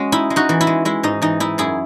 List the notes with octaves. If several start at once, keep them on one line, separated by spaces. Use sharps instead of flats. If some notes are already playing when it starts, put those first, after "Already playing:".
Already playing: G#3 C#4 F#4
D#4 E4
G#3
D#4 F#4
E3
E4
G#3
G#3 E4
G#2 D#4
E3 D#4
D#4 E4
F#2 E4 G#4